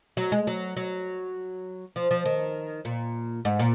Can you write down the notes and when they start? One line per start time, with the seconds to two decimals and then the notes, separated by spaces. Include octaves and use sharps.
0.17 F#3
0.32 G#3
0.47 F#3
0.76 F#3
1.96 F3
2.11 F3
2.26 D#3
2.85 A#2
3.45 G#2
3.59 A#2